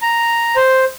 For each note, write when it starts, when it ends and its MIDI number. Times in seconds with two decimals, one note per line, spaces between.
0.02 0.56 82
0.56 0.85 72